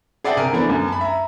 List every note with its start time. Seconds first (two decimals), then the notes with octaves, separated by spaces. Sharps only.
0.24 G#4 D5 E5 F#5 G5 A5
0.37 C3 A#4 G#5
0.53 E3 A3 B3 D4
0.70 F#2
0.88 A5 B5
1.01 E5 A#5